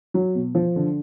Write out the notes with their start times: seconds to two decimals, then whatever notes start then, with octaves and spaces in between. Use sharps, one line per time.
0.14 F#3
0.35 B2
0.55 F3
0.76 D3